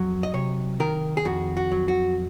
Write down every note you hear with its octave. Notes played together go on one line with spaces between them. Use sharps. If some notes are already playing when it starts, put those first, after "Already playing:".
Already playing: F2 F#3
D#5
C3 C#5
D#3 A#4
G#4
F2 F#4
F#4
F#3
F#4